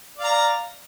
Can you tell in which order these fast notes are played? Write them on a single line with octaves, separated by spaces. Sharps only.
D5 F5 A#5